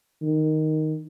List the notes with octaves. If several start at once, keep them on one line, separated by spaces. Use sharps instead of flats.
D#3